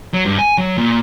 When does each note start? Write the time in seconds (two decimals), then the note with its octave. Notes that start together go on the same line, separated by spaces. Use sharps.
0.13 F#3
0.26 G2
0.39 G#5
0.58 F#3
0.78 A#2